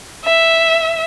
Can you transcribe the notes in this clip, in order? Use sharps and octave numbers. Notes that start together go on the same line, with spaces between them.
E5